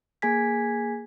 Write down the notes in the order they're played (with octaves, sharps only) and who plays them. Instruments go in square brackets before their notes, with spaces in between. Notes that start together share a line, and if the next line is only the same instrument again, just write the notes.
[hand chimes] A#3 G#4 G#5 G#6 B6